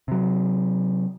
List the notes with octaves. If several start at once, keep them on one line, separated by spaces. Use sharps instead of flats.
C3 F#3